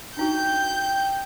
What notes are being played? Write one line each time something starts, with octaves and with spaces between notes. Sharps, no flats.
D4 D#4 F#4 G5 G6